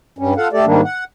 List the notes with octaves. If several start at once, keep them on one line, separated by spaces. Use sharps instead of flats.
G2 G3 C#4
F4 A4 F5 F#5
A3 G4 A4 D5
G#2 D#3 G3 A#3 D4
F#5